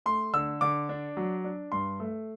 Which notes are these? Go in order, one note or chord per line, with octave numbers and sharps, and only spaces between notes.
A3 C6
D3 E6
D3 D6
D4
F#3
D4
G2 C6
A3